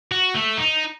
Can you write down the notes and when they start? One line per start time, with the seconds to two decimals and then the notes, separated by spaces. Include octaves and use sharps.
0.12 F#4
0.35 A3
0.57 D#4